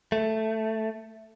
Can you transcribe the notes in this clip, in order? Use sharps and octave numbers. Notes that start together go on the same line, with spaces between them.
A3